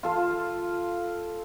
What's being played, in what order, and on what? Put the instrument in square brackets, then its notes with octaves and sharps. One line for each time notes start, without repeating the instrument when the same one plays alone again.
[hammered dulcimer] F4 A4 F5